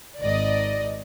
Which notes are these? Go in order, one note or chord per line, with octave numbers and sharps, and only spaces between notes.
G#1 D5 D#5